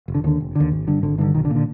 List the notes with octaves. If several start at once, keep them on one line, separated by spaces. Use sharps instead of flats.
F1
D3
D#2 D3 D#3
F1
D#2 D3
G#1
G2 D3
G#1 D3
G2 D3 D#3
B1 D#3
D3
A#2
D3